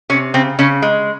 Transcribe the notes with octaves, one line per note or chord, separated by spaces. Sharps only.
C3 C#4
C#3 C4
C#3 C#4
G#3